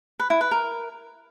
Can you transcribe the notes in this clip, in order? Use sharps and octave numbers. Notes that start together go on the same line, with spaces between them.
B4
E4
B4
A#4